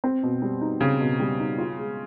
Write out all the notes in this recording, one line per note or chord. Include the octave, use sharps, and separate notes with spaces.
C4
B2
G3
D#4
C#3 C4
B2
G3
D#4
F4
G#3